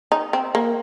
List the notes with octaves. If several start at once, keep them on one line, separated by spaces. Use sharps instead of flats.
D#4
C4
A#3